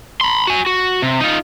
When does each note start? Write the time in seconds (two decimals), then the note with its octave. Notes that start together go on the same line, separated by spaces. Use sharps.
0.21 B5 C6
0.47 F#4 G#5
0.66 F#4
1.02 C3
1.21 D#4 F4